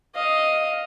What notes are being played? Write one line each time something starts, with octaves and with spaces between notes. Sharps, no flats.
D#5 F5